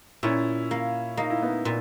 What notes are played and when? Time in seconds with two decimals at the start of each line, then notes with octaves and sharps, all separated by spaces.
0.23 A#2 C#4 E4
0.71 A#3
1.17 A#3 D#4
1.30 E4
1.42 B3 D#4
1.65 A#2